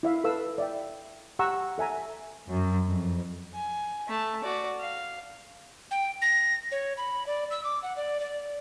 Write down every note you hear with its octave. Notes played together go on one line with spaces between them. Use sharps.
E4 E5 F5
A4 B4 F5 E6
D5 E5 G5
G4 F#5 A#5 C#6 E6
A4 E5 G#5 A#5
F#2
F2
G#5
A3 A5
F#4 D5
F5
G5
A#6
C#5
B5
D5
E6
D6
F#5
D5
D5